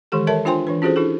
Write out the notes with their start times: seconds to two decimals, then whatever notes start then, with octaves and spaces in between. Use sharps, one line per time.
0.12 D#3 E3 G#3 G4 A4
0.27 A4 A#4 C#5 E5 A5
0.45 D4 F4 C5 G5 G#5 C6
0.67 E3 D4 B4
0.82 C#4 F4 F#4 G#4 A4 C5
0.96 D4 E4 G4 A4